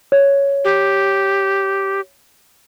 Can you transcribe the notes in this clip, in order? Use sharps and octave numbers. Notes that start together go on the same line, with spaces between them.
C#5
G4